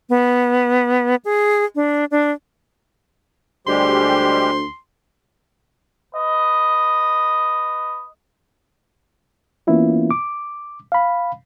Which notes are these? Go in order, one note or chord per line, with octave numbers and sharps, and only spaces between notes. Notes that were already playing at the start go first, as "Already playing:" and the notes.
B3
G#4
D4
D4
D2 G3 G#3 G4 C5 C6
B4 D#5
E3 A#3 B3 C#4 E4 F4
D6
F5 B5